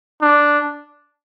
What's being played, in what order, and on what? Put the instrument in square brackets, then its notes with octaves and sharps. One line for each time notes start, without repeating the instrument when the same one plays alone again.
[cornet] D4